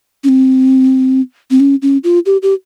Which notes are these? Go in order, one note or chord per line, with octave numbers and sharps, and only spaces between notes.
C#4
C4
C4
C#4
C#4
F4
G4
G4